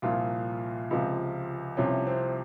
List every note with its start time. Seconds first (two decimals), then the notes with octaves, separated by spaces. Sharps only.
0.02 C2 A#2 F3 F4
0.91 C#2 C3 F3
1.77 C2 C3 F3 C#4
2.07 C4